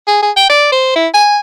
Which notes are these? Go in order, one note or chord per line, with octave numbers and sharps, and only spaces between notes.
G#4
G#4
G5
D5
C5
E4
G#5